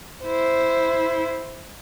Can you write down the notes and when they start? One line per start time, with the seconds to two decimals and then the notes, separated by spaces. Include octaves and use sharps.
0.23 E4 C5